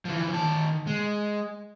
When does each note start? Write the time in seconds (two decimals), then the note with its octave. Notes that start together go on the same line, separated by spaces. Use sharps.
0.05 E3 F3
0.34 D#3 A5
0.87 G#3